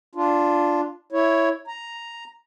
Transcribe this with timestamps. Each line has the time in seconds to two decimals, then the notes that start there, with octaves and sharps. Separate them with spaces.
0.15 D4 F4
1.12 E4 C#5
1.67 A#5